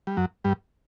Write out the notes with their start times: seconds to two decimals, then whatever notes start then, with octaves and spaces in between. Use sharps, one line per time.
0.07 G3
0.17 F#2 F#3
0.44 G2 G3